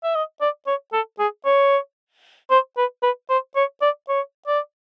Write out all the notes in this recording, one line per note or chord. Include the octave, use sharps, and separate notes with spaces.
E5
D#5
D5
C#5
A4
G#4
C#5
C5
B4
B4
C5
C#5
D5
C#5
D5